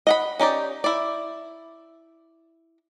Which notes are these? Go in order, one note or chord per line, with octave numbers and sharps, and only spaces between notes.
D#5 F#5 B5
C#4 D#4 G4 D5
E4 D5